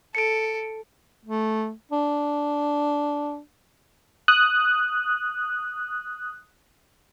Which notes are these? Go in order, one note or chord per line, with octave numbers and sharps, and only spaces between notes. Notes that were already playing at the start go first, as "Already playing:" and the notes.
A4 C#7 D7
A3
D4
D#6 F#6